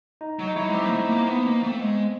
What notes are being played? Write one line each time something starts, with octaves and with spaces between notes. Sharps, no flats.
D#4
F#3
D#4
F#3 E4
D#4
G#3
G3 C4
A#3
A3
A#3
B3
A#3
A3
C4
G#3 B3